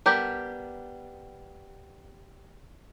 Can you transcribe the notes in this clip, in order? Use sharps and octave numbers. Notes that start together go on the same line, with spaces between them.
G3 B3 D4 G4 A#4